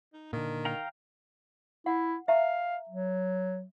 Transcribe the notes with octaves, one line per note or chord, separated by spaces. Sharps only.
D#4
A#2 D3 D#3
F5 G5 A#5
E4 F#5
E5 F5 A#5
F#3